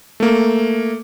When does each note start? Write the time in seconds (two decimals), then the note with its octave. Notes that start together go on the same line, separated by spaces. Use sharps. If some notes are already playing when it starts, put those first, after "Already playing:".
0.20 A3 A#3